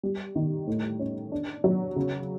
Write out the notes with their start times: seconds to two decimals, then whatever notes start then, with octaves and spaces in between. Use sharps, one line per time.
0.03 G3
0.36 D#3
0.67 A2
0.99 C#4
1.32 D4
1.64 F#3
1.96 C#3